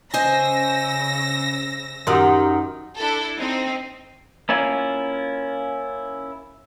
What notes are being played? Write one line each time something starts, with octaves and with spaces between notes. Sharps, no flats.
C#3 C5 D#5 G#5 E6 A#6
F#2 D#3 G4 F#5 C6
D4 E4 A4
C4 D#4
A#3 C#4 E4 F4